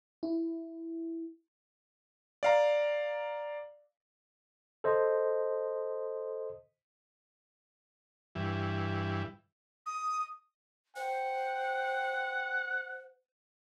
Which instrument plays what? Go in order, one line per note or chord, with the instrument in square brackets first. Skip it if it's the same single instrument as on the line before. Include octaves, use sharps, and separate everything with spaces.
[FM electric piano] E4
[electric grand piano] D5 F5 A#5
[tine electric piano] A4 C5 D#5
[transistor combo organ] G2 E3
[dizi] D#6
[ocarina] C5 [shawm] F#5 [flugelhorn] G5